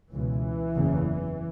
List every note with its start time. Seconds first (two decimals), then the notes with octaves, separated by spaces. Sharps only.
0.13 C#2 B2 E3
0.75 F#1 E2 C#3